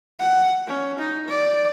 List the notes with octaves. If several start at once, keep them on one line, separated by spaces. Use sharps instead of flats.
F#5
C#4
D#4
D5